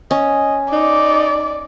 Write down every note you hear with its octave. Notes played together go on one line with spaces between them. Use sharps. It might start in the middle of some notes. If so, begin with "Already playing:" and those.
C#4 D#5
D#4 D5